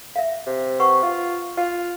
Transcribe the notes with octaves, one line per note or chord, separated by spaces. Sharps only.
E5 F5
C3
B4 F#5 C#6
F4
F4